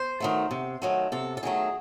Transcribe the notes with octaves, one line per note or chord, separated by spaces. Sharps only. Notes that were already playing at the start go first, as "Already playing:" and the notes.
Already playing: C5
D#3 F#3 A3
C3
D#3 F#3 A3
C3 A4
A4
D#3 F#3 A3 G#4